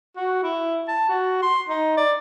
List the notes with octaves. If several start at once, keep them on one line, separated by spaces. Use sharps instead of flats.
F#4
E4
A5
F#4
C6
D#4
D5